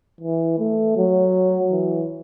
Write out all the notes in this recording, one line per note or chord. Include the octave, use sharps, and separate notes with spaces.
E3
A3
F#3
E3